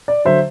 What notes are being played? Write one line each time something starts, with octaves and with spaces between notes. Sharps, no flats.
D5
D3 F#3 C5 E5